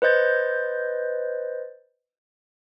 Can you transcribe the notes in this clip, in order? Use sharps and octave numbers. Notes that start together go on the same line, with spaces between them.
B4 C5 D#5 G6 A6